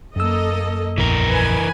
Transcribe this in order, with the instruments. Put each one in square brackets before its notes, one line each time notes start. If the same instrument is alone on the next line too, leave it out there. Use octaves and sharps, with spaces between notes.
[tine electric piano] F#2 E6 [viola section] A#3 A4 D#5
[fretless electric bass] A#1 E2 [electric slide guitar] E3 A#4
[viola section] B4 G#5